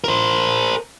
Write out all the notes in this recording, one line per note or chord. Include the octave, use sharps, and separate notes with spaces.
A#4 C5